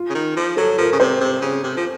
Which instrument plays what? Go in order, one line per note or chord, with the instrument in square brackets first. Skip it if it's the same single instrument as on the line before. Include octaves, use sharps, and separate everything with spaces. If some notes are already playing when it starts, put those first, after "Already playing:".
Already playing: [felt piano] F4
[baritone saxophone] C#3
D#3
F3
[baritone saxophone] F#3 [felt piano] A4
[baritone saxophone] F3 [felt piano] A#4
[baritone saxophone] C#3
[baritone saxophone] C3 [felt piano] C5
[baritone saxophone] C3
C#3
C3
F3